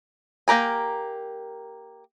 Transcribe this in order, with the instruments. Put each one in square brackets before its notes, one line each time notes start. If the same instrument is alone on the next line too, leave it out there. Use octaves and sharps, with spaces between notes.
[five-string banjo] A#3 G4 A#4 G#5